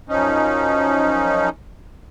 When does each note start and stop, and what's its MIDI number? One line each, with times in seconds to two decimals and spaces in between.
0.09 1.49 42
0.09 1.49 53
0.09 1.49 61
0.09 1.49 63